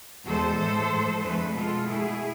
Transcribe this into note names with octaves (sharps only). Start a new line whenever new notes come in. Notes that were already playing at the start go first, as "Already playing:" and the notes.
E2 B2 G#3 A4 C5
A2 E3 G#3
A2 F3 G#3
F2 D3 F3 A3 G#4 B4
B2 G#3 F4 A4
B2 A3 E4 G#4